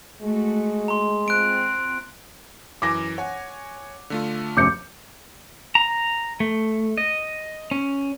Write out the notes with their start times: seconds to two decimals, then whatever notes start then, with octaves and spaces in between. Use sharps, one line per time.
0.22 G#3 A3 F#4
0.88 A#5 C6
1.28 C4 F4 F#6 D7
2.82 F#2 E3 G#5 D6 A#6
3.18 C#5 F#5 G#5
4.10 D3 A3 F4
4.57 F1 F#2 D6 G6 C#7
5.75 A#5
6.40 A3
6.98 D#5
7.71 C#4